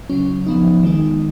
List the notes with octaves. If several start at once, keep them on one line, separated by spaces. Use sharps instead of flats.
C#3 F#3 C#4
F3 B3 D#4
D#3 G#3 D#4